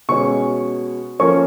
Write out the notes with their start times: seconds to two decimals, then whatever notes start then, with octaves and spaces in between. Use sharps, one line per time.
0.09 B2 G#3 C#4 C#6
1.20 F3 A#3 C#4 C#6